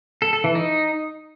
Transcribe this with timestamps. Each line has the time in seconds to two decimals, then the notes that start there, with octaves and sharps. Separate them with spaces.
0.22 A4
0.33 A4
0.44 E3
0.55 D#4